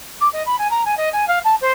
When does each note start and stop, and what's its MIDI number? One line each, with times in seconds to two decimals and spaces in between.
0.20 0.28 86
0.32 0.42 75
0.46 0.55 83
0.58 0.69 80
0.70 0.84 82
0.85 0.96 80
0.97 1.09 75
1.12 1.27 80
1.27 1.38 77
1.44 1.55 81
1.61 1.72 72